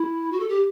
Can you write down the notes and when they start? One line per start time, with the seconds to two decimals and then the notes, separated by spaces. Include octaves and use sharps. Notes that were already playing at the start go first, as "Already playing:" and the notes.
Already playing: E4
0.32 F#4
0.40 A4
0.49 G4